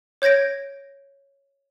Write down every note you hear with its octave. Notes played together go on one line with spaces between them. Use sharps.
C#5 G6 G#6 A#6 D7